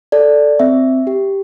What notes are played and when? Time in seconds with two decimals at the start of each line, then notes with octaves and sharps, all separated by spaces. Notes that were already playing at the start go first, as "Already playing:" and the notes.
0.12 A4 D5
0.60 C4 E5
1.07 G4